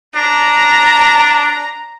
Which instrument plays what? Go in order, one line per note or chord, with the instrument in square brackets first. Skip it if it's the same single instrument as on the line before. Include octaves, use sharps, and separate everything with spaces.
[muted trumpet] D4 [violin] A#5